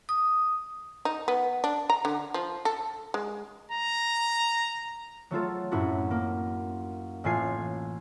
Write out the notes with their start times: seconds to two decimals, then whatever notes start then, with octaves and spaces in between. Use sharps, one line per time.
0.09 D#6
1.05 D#4
1.28 B3
1.64 D4
1.90 A#5
2.05 D3
2.34 F3
2.65 A4
3.14 G#3
3.72 A#5
5.31 F#3 A3 F4 A4
5.72 F#2 A2 E4 F#4
6.11 A#3
7.24 A1 A2 F4 G#5 C7